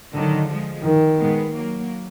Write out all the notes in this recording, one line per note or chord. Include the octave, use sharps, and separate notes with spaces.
D3 D#3 F#3
F3 G#3
D#3
G#3 B3
F#3 A#3